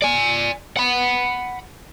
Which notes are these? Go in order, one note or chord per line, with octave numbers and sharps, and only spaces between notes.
D5 G#5
F#5 B5